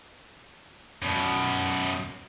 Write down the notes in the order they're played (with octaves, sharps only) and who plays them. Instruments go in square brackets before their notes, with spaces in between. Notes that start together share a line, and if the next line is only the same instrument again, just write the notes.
[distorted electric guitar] F#2 B2